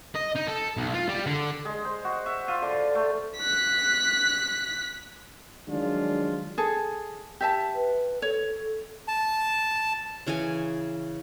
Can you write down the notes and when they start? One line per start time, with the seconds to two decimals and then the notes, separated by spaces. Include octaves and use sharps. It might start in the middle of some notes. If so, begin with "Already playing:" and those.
0.15 D#5
0.36 D#4
0.48 A4
0.77 B1
0.94 F4
1.09 G3
1.26 D3
1.65 G#3
1.85 C5
2.05 F#4
2.26 E5
2.48 F4
2.62 D3
2.95 A3
3.38 F#6 B6
5.69 D#3 F3 F#3 G#3 D4 F4
6.58 G#4 A4
7.41 G4 E5 A5
7.75 B4
8.22 A4 C#5
9.08 A5
10.27 C#3 E3 C#5 G#5